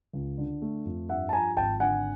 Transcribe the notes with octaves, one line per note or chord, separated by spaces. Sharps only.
C#2
D3
A3
F2
G2 E5 F#5
A5
F3 G#5 A#5
G#1 G5 A5
D3 F#5 G#5